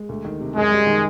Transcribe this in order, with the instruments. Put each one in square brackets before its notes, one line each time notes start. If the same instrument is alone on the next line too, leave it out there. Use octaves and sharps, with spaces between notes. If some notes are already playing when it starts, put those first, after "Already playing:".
Already playing: [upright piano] G#3
D2
D#3
C3
[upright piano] F#2 [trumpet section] G#3
[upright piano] G3
D#3